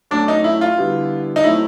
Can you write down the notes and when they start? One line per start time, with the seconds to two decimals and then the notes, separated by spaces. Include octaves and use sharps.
0.11 F#3 A3 C#4 D4
0.28 D#4
0.44 E4
0.61 F4
0.78 D3 G3 B3 E4
1.36 D#4
1.44 F#3 A3 C4 E4